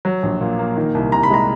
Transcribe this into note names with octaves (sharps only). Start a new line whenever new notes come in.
F#3
A#1
A#2
A#3
D#3
C2
C3 A#5
B5
G#3 A#5